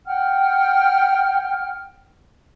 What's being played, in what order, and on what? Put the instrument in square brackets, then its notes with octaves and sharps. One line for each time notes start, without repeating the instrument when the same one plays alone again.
[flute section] F#5 G5 F6